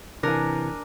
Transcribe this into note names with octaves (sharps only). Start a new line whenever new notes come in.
C3 E3 D4 A#4 G#5